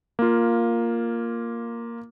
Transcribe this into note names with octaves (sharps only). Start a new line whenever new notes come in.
A#3 F4